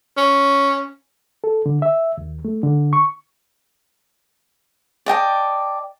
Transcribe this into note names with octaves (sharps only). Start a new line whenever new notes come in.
C#4
A4
D3
E5
D#2
A3
D3
C#6
D5 D#5 G5 A5